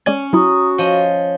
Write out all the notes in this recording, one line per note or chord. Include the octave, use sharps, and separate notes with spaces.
G#3 C#4 D5 G#6
F#3 E4 F#4 A#5 D#6
F3 C#5 D#5